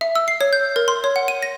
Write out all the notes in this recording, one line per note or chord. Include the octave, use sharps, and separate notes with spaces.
E5
E6
C7
C#5
G6
A#4
C6
C#5
F#5
D#7
A#6